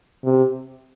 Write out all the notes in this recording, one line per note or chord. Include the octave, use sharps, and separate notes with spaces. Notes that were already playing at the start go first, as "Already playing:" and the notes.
C3